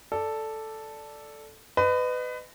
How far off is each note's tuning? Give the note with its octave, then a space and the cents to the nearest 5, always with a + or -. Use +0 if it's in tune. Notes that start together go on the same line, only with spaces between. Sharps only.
A4 +0 D5 +0
B4 +25 D#5 -25